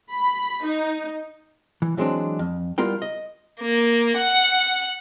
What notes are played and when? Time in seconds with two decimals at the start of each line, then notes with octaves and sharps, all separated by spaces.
0.11 B5
0.65 D#4
1.82 E3
1.97 E3 F#3 G#3 C4 D4
2.39 F2
2.78 G3 B3 E4 F4 A#4 G5
3.02 D#5
3.61 A#3
4.17 F#5